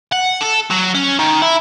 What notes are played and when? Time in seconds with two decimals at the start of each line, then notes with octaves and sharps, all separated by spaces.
0.12 F#5
0.41 A4
0.71 F#3
0.94 C#4
1.19 D#3
1.42 E4